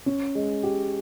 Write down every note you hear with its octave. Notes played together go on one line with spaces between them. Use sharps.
C#4
G#3
G4